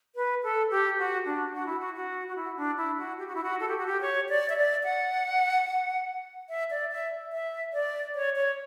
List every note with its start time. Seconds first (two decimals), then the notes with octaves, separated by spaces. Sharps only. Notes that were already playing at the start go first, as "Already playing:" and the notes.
0.16 B4
0.43 A4
0.71 G4
0.98 F#4
1.25 D4
1.54 F#4
1.66 E4
1.80 F#4
1.95 F#4
2.28 F#4
2.36 E4
2.57 D4
2.77 E4
2.98 F#4
3.19 G4
3.27 F#4
3.35 E4
3.43 F#4
3.60 A4
3.68 G4
3.78 F#4
3.87 G4
4.01 C#5
4.29 D5
4.50 E5
4.57 D5
4.84 F#5
6.49 E5
6.71 D5
6.91 E5
7.32 E5
7.73 D5
8.15 C#5
8.36 C#5